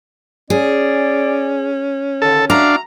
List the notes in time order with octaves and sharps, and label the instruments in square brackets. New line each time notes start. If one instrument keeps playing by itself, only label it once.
[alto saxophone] C#4 [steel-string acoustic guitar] G#4 [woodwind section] D5
[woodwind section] D#2 D3 D#3 [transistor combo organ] A4
[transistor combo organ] D4 F5 [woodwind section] F#4 E5 [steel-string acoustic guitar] A#5